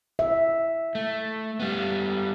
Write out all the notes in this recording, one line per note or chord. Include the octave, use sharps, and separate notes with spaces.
E5
A3
G3 B3